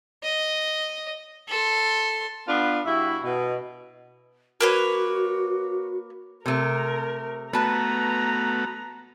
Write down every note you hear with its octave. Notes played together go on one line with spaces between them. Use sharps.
D#5
A4 C6
B3 D4 F4 B4
G2 E4 F#4 E5
B2
A#3 F#4 B4 C#5
C3 A3 A#4
A3 B3 F#4 B4 A5 A#5